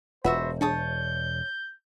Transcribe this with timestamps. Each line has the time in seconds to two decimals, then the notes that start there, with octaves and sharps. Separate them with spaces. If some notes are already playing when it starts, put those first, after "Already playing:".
0.24 E1 F4 F#4 B4 C5 E5 F#5 B5
0.61 D4 G#4 C#5 A5 D#6 G6